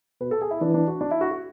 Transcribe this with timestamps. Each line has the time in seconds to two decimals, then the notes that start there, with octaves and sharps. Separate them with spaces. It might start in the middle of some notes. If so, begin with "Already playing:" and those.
0.21 B2 B4
0.31 A4
0.41 G#4
0.51 E4
0.61 E3 D4
0.74 D4
0.87 F#4
1.01 D4
1.11 E4
1.21 F#4
1.31 F#4